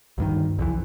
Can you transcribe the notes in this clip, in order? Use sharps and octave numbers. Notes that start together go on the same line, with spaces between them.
D2 G2 D#3
C2 F2 E3